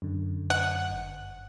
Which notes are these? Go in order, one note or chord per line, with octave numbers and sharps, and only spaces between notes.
F#2 D3
F#5
G1